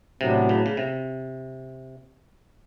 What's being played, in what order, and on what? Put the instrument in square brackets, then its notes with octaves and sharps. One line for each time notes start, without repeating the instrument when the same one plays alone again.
[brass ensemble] A2 F#3 B3 D4 [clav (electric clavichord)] C3
[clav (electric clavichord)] C#3
C#3
C3